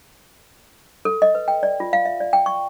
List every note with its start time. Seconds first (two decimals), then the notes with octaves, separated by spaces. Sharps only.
1.05 A4
1.22 D#5
1.35 B4
1.48 G5
1.63 D5
1.80 F4
1.93 F5
2.05 E5
2.20 D5
2.33 G5
2.46 C#6